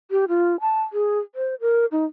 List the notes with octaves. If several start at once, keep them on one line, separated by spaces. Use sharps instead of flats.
G4
F4
A5
G#4
C5
A#4
D#4